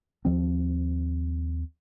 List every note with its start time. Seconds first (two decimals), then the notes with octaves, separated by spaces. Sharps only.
0.25 D#2 F3 C4